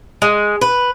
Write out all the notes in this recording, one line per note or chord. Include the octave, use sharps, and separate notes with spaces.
G#3
B4